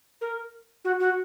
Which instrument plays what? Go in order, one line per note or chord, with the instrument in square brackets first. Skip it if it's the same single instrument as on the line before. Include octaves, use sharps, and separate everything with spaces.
[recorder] A#4
F#4
F#4